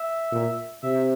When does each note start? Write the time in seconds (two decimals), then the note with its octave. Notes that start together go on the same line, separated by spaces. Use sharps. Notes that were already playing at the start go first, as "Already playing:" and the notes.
Already playing: E5
0.32 A#2
0.83 C3 E5